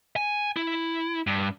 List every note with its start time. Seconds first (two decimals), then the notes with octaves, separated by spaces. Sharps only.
0.16 G#5
0.57 E4
1.27 G2